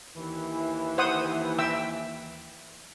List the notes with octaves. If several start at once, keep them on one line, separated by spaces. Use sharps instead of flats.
D#2 E3
C5 F#5 D#6
E5 G5 E6